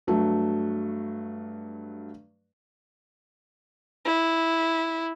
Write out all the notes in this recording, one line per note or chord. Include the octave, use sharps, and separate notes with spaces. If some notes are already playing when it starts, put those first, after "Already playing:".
G2 F#3 A3
E4